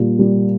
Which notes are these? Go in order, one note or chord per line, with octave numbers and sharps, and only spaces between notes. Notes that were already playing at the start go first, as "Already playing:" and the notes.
Already playing: A#2 G3
G3